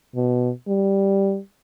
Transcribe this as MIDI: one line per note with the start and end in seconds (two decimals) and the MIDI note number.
0.15 0.50 47
0.68 1.39 55